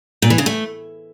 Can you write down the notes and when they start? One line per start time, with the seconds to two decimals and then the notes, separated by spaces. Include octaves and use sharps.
0.22 A#2
0.30 E3
0.38 C#3
0.46 A3